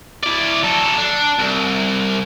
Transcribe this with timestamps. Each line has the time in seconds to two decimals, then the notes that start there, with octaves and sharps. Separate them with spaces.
0.23 E4 D5
0.63 F#3 A4
0.98 D4
1.39 C2